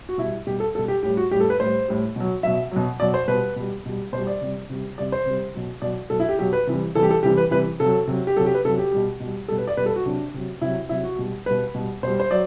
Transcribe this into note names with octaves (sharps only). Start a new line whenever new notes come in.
F#4
B2 G3 E4
B2 G3 G4
A4
B2 G3 A4
G4
A2 G3 G4
F#4
A2 G3 G4
A4
B4
A2 G3 C5
A2 G3
B2 F#3
B2 F#3 E5
B2 F#3
B2 F#3 D5
C5
B2 G3 B4
B2 G3
B2 G3
B2 C5
G3
D5
C3 G3
C3 G3
C3 G3 D5
C5
C3 G3
B2 F#3
B2 F#3 D5
B2 F#3 A4
E4
G4
B2 F#3 G4
B4
C3 E3 G3
C3 E3 G3 A4
G4
A4
C3 E3 G3 G4
B4
C3 E3 G3 B4
C3 F#3 A4
C3 F#3
G4
C3 F#3 A4
G4
B4
C3 F#3 A4
G4
B2 G3
B2 G3
B2 G3 A4
B4
D5
B2 G3 B4
A4
F#4
C3 F#3 D4
C3 F#3
C3 F#3 E4
C3 F#3 E4
F#4
B2 G3
B2 G3 B4
B2 G3
B2 G3 C5
C5
F#3 D5